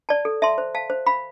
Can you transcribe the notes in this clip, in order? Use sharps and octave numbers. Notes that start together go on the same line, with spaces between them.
D5 A5
A4
E5 A5 C6
C5
F5 A5
C5
F5 B5